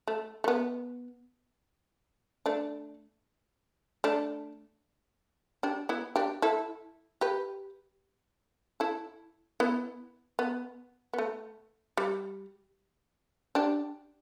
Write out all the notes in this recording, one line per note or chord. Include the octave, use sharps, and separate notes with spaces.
A3
A3
B3
A3 D4
A3 D4
D4 G4
B3 E4
D4 G4
E4 A4
G4 B4
E4 A4
B3 E4
B3
B3
A3
G3
D4 G4